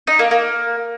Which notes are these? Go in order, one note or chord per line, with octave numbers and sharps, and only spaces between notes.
D#4
A#3
A#3